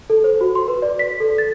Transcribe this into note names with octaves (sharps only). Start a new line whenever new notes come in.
A4
C5
F#4
C6
B4
D5
B6
A4
A6